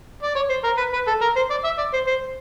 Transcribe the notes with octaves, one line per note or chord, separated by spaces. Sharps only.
D5
C#5
C5
A#4
B4
B4
A4
A#4
C5
D5
E5
D5
C5
C5